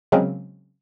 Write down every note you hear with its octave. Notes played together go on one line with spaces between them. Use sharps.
C#3 F#3 G#3 A#3 C4 C#4